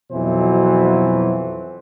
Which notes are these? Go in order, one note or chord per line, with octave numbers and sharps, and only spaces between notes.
F2 B2 E3 F#3 C5